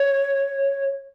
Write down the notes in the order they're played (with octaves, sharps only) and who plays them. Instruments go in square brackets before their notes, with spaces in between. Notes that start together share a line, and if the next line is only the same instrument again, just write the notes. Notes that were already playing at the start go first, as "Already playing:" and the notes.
Already playing: [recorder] C#5